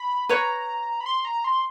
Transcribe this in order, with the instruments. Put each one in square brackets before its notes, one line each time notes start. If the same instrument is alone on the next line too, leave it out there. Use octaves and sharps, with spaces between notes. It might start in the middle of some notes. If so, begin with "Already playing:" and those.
Already playing: [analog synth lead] B5
[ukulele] B4 C#5 [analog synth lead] A#5
[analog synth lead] B5
C6
A#5
C6